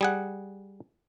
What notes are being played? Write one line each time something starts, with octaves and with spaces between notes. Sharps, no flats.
G3 G#4 F#5